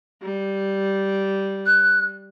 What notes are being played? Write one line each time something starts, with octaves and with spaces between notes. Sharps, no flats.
G3
F#6